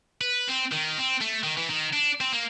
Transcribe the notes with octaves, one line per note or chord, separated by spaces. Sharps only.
B4
C4
D#3
C4
A3
D#3
E3
D#3
D4
C4
A#3